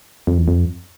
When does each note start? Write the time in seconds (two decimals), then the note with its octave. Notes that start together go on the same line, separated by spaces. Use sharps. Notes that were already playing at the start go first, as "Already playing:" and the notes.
0.27 F2
0.38 E2
0.48 F2